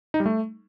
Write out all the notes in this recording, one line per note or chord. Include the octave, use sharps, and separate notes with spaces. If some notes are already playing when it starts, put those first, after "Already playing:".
D#4
G3
A3